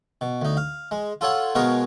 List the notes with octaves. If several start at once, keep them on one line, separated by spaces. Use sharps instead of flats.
B2
D2 D#4
F5
G#3
F4 A4 C#5 F#5
B2 G#3 B3 A#4 C#5 F5